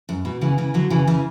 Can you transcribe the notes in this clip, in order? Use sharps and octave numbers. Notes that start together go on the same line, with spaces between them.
F#2
B2
C#3 E3
C#3 E3
D3 F#3
C#3 E3
C#3 E3